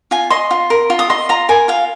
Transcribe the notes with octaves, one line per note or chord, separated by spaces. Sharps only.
F4 G#5
D#5 C6
F4
A#4
F4
D#6
D#5 C6
F4 A#5
A#4 G#5
F4 F5